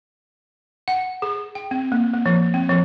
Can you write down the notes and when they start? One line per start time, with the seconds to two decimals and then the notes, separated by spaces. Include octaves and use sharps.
0.88 F#5
1.22 G#4
1.55 G5
1.71 C4
1.92 A#3
2.14 A#3
2.26 F3
2.54 C4
2.69 F3